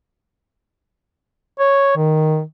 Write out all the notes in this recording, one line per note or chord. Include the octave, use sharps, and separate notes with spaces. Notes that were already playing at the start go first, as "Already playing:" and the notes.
C#5
D#3